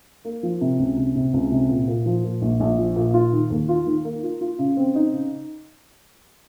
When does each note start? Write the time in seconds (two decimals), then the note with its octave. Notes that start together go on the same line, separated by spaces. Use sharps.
0.25 A#3
0.43 F3
0.61 C3
0.79 C#2
0.97 C3
1.15 C3
1.34 C#2
1.51 C3
1.69 A#2
1.88 A#2
2.06 F3
2.24 A#2
2.42 A#1
2.60 A#1
2.78 F3
2.96 A#2
3.14 F4
3.33 D#3
3.50 D#2
3.69 F4
3.87 D#3
4.04 A#3
4.23 F4
4.41 F4
4.59 C#3
4.77 C4
4.95 D#4
5.13 C#3